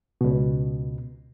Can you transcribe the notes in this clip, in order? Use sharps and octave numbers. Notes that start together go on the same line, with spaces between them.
C#2 B2